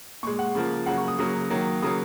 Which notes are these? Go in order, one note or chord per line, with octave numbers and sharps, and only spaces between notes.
A#2 G#3 C#6
F#5
C#3 F3 A#3
C#3 F#3 A#3 F#5
C#6
D#6
C#3 F#3 A#3 D#6
D#3 F#3 A#3
C#3 F#3 A#3 D#6